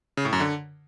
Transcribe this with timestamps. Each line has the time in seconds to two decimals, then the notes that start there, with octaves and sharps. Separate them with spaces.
0.17 C#3
0.25 A2
0.33 F#2
0.40 D3